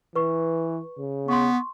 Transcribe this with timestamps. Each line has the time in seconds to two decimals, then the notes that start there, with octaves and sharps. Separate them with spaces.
0.16 E3 B4 C#6
0.99 C#3
1.28 B3 C6 C#6